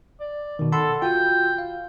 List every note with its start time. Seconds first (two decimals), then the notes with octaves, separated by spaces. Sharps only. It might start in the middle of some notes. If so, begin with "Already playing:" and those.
0.20 D5
0.59 B2 D#3
0.72 A4 F#5 B5 C6
1.02 F4 F#4 G5
1.58 F5